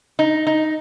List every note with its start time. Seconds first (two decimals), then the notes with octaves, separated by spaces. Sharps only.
0.19 D#4
0.47 D#4